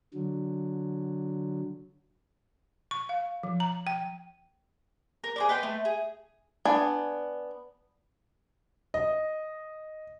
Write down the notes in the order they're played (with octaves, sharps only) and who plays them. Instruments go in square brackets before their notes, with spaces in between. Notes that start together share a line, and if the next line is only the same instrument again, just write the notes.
[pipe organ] D3 F#3
[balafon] C#6
F5
F3
A#5
G5
[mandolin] A#4
G#4 C5 D5
B4 D#5 G5 C6
A3
G#4
[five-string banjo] B3 D4 G#5
[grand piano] D#5